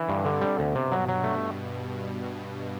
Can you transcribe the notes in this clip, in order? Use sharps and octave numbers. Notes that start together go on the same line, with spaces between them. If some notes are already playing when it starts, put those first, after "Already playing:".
Already playing: D3 E3
G2 C3
D3
B2 G3
D2
G2 C3
F#3
F#3
A3